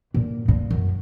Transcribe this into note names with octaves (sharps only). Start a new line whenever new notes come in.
A#2
A#2
F#2